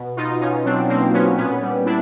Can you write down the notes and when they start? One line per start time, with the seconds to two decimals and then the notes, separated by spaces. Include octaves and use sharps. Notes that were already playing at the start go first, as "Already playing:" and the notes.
Already playing: B2
0.17 B2 D#4 F4
0.41 B2 C#4 D#4
0.65 F#3 C4 D4
0.89 B2 A#3 C4
1.13 F#3 B3 C#4
1.37 A#2 B3 C#4
1.62 G3
1.86 G3 D4 E4